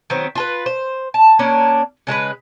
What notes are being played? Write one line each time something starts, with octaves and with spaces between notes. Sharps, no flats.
D#3 F#3 B3 C4
F4 A4 B4
C5
A5
A#3 C#4 D4 D5
C#3 G#3 A4 B4